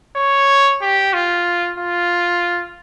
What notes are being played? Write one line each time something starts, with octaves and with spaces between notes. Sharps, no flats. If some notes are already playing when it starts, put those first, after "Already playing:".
C#5
G4
F4
F4